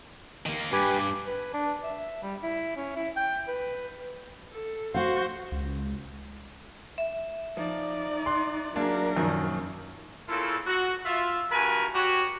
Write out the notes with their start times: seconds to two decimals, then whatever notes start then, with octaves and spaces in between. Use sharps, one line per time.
0.46 D#3 A#3
0.72 G2 G4 B4 G#5
1.27 B4
1.54 D4
1.84 E5
2.23 G3
2.43 E4
2.77 C#4
2.96 E4
3.17 G5
3.48 B4
4.52 A4
4.94 F#4 C5 F5 F#5
5.52 C#2
6.98 E5
7.57 F3 D#4 D5
8.26 C6 F#6
8.76 F#3 A#3 D4 G#4 A#4
9.17 F#2 A#2 D#3 F3
10.29 A#2 C#3 E4 F4 A4
10.67 F#4
11.06 F4 E5
11.52 G2 F#4 A#4 B4 G#5
11.94 F#4 G4 C#5